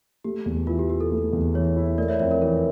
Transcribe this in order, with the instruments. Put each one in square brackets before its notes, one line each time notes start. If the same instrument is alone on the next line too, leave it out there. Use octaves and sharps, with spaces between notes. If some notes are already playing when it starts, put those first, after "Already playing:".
[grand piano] A3 [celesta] G4
[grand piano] E2
[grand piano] E3 [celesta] F4
[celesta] G4
[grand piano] E4 [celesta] G4
[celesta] A4
[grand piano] A3
E2
[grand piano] E3 [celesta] C#5
[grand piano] E4
[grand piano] A3 [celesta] A#4 D5
[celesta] C#5 E5
[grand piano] F2 [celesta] C#5 E5
[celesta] A#4
[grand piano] E3 [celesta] A#4